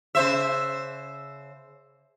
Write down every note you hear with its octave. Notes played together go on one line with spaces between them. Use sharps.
C#3 C5 E5